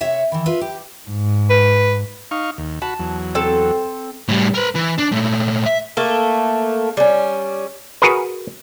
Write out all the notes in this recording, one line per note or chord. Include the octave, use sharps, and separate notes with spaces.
C3 C#5 E5 F#5
D#3 E3
F4 B4 E5
G4
G#2
B4
D#4 F5 C#6
D#2
F#4 A5 B5
E2 F#3
C4 A4
A2 G3
A#4 B4
E3
D4
A#2 A3
E5
A3 A#3 A4
G3 C#4
F#4 G#4 A#4 B4